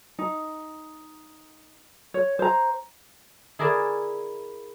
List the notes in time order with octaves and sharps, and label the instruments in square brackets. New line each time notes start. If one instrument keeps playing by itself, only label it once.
[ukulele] D#4
C#5
C5 A#5
[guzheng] E4 G#4 A#4 D5 E5